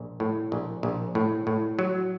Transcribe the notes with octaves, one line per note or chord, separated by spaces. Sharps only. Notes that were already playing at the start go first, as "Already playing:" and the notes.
Already playing: A#1
A2
A#1
A#1
A2
A2
F#3